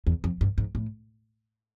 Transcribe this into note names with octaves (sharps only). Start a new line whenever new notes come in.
E2
F2
G2
G#2
A2